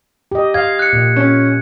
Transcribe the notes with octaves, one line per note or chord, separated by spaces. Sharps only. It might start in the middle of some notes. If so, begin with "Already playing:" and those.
G4 D#5
F5 G#6
F#6 C#7
A#2
C#4